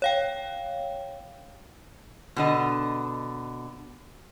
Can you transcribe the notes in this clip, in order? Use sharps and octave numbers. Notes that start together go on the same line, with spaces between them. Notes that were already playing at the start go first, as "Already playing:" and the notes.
C#5 F5 G5
B2 D3 D#5